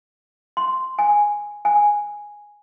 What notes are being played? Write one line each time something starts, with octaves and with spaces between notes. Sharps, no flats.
C6
G#5
G#5